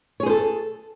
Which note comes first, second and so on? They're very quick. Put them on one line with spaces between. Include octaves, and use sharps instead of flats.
C#5 G#4 C5 A4